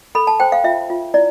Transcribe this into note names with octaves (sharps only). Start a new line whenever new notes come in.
A4 B5
A5
C5 G5
F5
F4 E5
F4
E4 D5